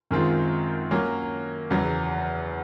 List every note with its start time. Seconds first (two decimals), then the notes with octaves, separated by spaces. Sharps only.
0.11 F#2 D#3 G#3 C4 F4
0.91 F#3 A#3 C#4
1.70 E2 C#3 F#3